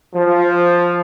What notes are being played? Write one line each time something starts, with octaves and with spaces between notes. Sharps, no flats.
F3